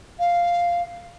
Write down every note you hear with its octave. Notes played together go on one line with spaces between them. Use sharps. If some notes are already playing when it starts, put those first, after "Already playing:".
F5